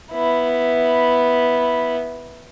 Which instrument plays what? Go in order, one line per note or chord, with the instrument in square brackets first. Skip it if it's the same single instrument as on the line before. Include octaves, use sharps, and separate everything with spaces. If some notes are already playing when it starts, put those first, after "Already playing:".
[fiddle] B3 E4